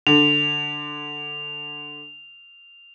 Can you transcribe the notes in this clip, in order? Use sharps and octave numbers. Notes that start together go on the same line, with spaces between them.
D3 F7